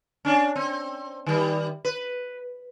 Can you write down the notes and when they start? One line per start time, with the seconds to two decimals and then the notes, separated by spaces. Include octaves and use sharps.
0.25 C#4 D4
0.56 C4
1.27 D#3 G3
1.85 B4